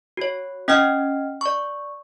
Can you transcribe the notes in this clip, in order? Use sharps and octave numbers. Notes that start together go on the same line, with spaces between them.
F#4 C#5
C#4 D#5 G5 F6
D5 C#6